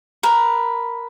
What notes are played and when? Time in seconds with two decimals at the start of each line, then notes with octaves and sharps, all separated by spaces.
0.23 A#4 B4